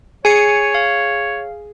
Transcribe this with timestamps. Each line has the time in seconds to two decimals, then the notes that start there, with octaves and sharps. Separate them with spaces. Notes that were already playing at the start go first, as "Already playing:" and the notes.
0.25 G#4 C#5 G#5 C7 C#7
0.75 F5